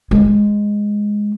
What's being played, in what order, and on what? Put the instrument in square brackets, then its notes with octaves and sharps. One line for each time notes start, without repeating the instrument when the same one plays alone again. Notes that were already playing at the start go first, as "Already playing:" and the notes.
[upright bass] G#3